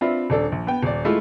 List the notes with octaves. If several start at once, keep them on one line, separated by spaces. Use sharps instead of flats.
C4 D4 F4 B4 E5
D#1 D4 A4
A#1
B3 G5
D#1 D5
G#3 A3 E4 F4